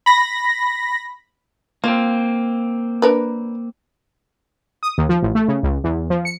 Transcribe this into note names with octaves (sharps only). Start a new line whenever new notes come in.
B5 A#6
A#3 C4 F4
D4 A#4 B4
D#6
D#2
F3
A1
A3
C#3
C#2
E2
F3
C#7